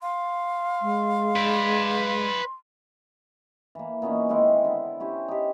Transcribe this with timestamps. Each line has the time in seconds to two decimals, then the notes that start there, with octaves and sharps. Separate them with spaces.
0.02 F5 C6
0.82 G#3
1.36 B4 D5
3.75 E3 A#3
4.02 A#2 B3 C#4 D#4
4.29 D#3 G#3 C4 E4
4.65 D3 B3
5.00 C#4 E4 G4 C5
5.28 D#4 G4